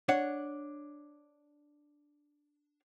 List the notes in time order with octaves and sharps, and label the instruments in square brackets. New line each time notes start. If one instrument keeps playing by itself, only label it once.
[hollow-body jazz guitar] D4 C#5 F#5